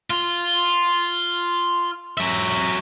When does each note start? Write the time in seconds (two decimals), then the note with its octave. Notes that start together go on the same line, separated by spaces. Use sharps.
0.10 F4
2.18 F#3 E5